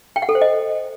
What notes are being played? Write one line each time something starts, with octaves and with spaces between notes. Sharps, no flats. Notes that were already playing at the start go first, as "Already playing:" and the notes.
G5
F#5
A4
C5
D#5